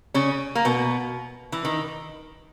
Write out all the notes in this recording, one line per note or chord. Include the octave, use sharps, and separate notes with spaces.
C#3 C#4
A#3
B2 B3
E3
D#3